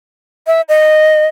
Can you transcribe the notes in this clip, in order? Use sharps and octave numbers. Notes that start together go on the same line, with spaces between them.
E5
D#5